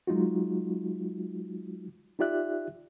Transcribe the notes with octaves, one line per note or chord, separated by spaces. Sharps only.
F#3 G#3 D#4 F4 F#4
D#4 F4 G4 D5 E5 F#6